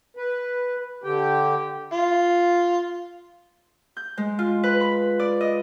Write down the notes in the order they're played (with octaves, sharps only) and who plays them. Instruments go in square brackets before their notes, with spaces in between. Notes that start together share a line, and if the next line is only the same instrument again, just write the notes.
[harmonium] B4
D3 G4 G5
[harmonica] F4
[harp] G6
G#3
F4
B4
B5
D5
D#5